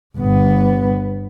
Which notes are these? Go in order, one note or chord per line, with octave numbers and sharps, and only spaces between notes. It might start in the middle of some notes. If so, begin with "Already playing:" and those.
G1 B3